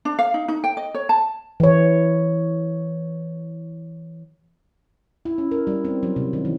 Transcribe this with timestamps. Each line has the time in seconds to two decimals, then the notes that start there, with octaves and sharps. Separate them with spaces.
0.05 D4
0.19 F5
0.34 D#4
0.48 D#4
0.64 G5
0.77 D#5
0.94 C#5
1.09 A5
1.60 E3 C#5
5.25 E4
5.38 C#4
5.51 A#4
5.67 G3
5.85 C4
6.03 F#3
6.16 C3
6.33 D#3
6.45 E3